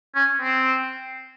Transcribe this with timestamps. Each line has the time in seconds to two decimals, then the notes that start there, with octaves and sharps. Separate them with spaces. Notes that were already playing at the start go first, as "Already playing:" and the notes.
0.15 C#4
0.41 C4